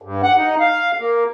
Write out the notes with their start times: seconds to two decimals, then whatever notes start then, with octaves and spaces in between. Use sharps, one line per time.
0.02 G2
0.23 F#5
0.37 D#4
0.60 F5
0.98 A#3